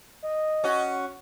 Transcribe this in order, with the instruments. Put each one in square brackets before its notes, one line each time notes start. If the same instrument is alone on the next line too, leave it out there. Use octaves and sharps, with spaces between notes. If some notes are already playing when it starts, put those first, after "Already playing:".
[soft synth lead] D#5
[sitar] C#4 F#4